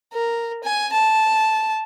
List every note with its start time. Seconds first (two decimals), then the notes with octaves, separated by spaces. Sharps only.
0.13 A#4
0.64 G#5
0.93 A5